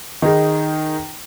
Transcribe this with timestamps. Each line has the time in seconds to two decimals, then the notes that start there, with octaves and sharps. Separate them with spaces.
0.22 D#3 D#4 G#4